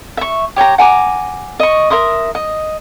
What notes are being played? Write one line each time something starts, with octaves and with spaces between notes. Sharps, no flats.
E5 C#6
G4 C#5 G5 A#5
F#5 G#5 A#5 D6
D#5 C#6
A#4 E5 C6 D#6
D#5